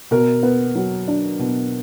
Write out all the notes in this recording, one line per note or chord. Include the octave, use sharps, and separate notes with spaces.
B2 A#4
B3
F#3
D4
B2